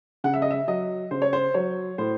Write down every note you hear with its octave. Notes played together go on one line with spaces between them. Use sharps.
C#3 F#5
E5
D#5
E5
F#3 D#5
C#3 C5
C#5
C5
F#3 C#5
A2 C5